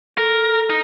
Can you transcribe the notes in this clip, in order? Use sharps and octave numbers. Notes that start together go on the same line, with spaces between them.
A4 A#4
D#4